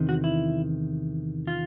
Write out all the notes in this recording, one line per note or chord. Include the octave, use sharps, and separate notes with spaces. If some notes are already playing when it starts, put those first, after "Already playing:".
Already playing: E2 C3 D#3
F#4
E4
F4